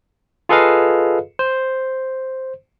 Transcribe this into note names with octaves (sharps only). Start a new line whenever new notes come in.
F4 G#4 A4 B4 D#5 F5
C5